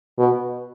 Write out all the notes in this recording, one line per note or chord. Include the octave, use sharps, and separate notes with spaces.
B2